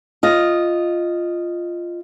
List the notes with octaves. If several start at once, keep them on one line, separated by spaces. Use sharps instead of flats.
F4 D#5